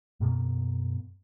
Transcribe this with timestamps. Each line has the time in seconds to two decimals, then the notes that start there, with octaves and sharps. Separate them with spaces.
0.20 F#2 B2 A#3 B3